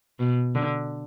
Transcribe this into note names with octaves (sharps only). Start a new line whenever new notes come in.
B2
D3